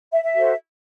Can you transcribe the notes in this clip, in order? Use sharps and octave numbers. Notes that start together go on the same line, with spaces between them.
E5
E5
F#4 A4 C5